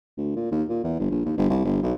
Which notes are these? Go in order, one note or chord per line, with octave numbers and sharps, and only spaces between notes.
D2
A#2
D#2
A#2
E2
G1
A#1
D#2
G1
C2
G1
B1